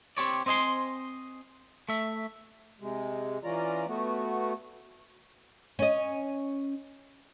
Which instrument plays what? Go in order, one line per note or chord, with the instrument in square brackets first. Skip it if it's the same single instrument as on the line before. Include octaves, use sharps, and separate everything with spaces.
[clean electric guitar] C4 G4 C#5 D5
C4 C5 D#5 G#5 C6
A3 E5
[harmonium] C3 G#3
E3 C#4 F4 D5 A#5
A3 B3 F#4
[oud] C#4 D#5